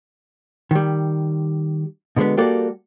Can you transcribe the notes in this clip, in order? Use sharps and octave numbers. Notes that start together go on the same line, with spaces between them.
D#3 G3
B2 D3 F#3 G#3 B3
G3 A#3 F#4 G4 A4 D5